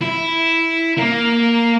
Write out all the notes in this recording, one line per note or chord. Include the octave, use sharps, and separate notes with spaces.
E4
A#3